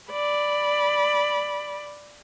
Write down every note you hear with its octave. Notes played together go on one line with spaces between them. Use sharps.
D5 B5